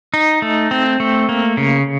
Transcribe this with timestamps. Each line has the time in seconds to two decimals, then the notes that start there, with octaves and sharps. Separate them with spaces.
0.14 D#4
0.42 A3
0.71 C4
1.00 A3
1.29 A#3
1.57 C#3